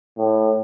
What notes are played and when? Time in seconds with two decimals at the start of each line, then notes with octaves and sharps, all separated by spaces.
0.18 A2